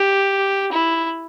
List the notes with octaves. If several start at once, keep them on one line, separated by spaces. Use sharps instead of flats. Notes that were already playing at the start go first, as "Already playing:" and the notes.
Already playing: G4
E4